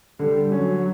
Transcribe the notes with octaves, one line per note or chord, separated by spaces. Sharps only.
D3 G3
F#3 C#4